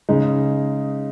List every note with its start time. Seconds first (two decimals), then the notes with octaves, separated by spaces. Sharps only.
0.09 C#3 G#3 D#4